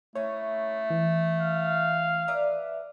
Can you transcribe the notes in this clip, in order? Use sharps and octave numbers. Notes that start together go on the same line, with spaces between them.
A3 C#4 D#4 E4 C#5
E3
F5
B4 D5 E5 A#5